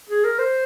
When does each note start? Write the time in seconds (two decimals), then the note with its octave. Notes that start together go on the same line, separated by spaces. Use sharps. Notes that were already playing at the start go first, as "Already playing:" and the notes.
0.09 G#4
0.24 A#4
0.39 C5